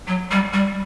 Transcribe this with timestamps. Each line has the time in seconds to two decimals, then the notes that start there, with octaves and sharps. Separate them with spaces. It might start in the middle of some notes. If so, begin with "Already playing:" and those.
0.07 F#3
0.31 G3
0.53 G3